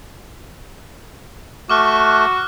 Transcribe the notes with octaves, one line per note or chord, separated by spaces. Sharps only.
A3 F#4 D6 F6 F#6